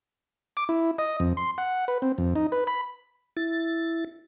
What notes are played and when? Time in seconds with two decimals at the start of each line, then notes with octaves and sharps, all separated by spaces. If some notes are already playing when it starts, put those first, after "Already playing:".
0.57 D6
0.69 E4
0.98 D#5
1.20 F2
1.37 C6
1.58 F#5
1.88 B4
2.02 C4
2.18 F2
2.36 D#4
2.52 B4
2.67 B5
3.37 E4 A6